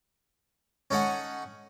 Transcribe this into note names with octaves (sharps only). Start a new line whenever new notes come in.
C#4 D#4 A4 F#5 G#5